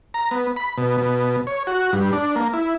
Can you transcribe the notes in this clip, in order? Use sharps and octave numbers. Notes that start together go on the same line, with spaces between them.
A#5
B3
B5
B2
B2
C#5
F#4
G2
D4
A#3
E4